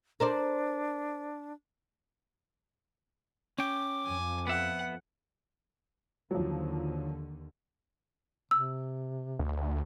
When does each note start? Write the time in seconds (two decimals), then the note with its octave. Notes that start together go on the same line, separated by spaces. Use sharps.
0.20 D4 A#4 C5 D5
3.58 C#4 G5 D6
4.05 F2 G#5
4.47 B3 E5 F#5
6.31 D#2 D3 F3 F#3
8.51 C3 E6
9.39 D2